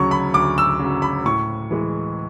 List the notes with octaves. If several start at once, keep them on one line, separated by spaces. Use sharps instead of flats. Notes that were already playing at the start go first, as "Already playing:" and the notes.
Already playing: D2 C#3 F#3 C#6
B5
D2 D6
E6
C#3 F#3
B5
A2 C#6
E3 G#3